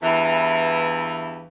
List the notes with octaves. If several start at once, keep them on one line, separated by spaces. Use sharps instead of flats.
E2 G2 E3